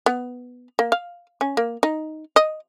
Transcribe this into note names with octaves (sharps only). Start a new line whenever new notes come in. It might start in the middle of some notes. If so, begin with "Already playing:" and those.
B3
A#3
F5
C#4
A#3
D#4
D#5